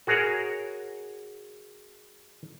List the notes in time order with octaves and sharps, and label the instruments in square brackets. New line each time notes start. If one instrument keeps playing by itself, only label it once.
[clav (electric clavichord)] F#4 G#4 A#4 C#5 F#5